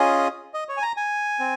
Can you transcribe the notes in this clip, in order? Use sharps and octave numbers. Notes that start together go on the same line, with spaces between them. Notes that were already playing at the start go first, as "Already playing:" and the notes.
Already playing: C#4 F4 G#4 D#5
D#5
C#5
G#5
A#5
G#5
C4